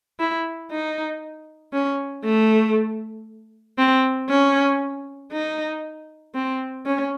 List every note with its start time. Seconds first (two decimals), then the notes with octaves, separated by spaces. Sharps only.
0.20 E4
0.71 D#4
1.73 C#4
2.25 A3
3.78 C4
4.30 C#4
5.32 D#4
6.35 C4
6.86 C#4